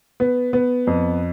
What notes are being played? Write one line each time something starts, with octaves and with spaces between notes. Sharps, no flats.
B3
B3
F2